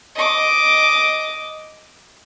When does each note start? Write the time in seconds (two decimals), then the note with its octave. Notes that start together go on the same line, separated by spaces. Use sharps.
0.15 D#5 D6